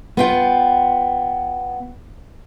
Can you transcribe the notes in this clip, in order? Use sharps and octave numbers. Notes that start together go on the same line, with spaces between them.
B3 F4 G5